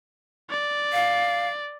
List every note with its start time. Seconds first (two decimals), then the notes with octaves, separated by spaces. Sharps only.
0.50 D5
0.93 F5